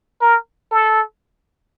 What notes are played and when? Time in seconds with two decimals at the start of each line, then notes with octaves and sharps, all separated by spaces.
0.21 A#4
0.71 A4